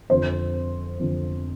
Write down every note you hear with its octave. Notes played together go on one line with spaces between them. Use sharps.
F2 D3 F3 C5
F2 D3 F3